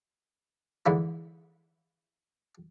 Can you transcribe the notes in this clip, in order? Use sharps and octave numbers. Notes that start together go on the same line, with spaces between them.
G#2 D3 E3 E4